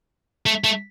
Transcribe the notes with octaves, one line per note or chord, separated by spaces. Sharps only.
A3
A3